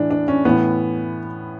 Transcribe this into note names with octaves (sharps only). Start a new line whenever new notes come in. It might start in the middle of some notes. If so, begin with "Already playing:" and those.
Already playing: A2 E3 D4
D4
C#4
A2 E3 B3